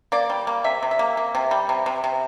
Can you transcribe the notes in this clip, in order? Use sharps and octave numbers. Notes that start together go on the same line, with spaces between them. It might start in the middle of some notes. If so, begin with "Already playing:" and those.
A#3 D5
G3
A#3
C3 E5
C3
E5
A#3
A#3
C3
G3
C3
C3
C3